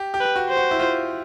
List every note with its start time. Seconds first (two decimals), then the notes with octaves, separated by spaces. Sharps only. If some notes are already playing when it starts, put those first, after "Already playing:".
Already playing: G4
0.14 G4
0.20 B4
0.36 F#4
0.50 C5
0.57 F#4
0.71 E4
0.79 F4